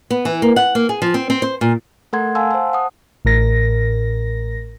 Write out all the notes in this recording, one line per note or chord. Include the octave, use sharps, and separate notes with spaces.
B3
E3
A#3
F#5
A#3
G#4
F3
C4
C4
C5
A#2
A3 A4 A#4 F#5 C6 G#6
F5 F#5 G#5 A5 C6 E6
C5 A5
F#5 D#6
A1 A2 A#4 A#6